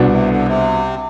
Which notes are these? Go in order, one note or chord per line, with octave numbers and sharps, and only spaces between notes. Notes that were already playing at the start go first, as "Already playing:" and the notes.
Already playing: C2 B2 B3 D4
C3
D3
C3